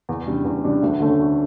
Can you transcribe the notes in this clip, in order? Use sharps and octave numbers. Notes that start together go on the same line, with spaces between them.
E2
C#3 G3 D4
E2
C#3 G3 D4
D2
D3 A3 C#4
D2